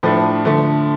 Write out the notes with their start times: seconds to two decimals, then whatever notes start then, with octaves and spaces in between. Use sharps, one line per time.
0.03 A2 F3 A3 D4
0.45 D3 F3 A3